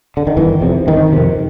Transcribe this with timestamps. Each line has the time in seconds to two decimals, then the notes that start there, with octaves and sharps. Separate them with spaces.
0.17 D3
0.27 D#3
0.37 G1 E3
0.61 F2 C3
0.87 G1 D#3
1.12 F2 C3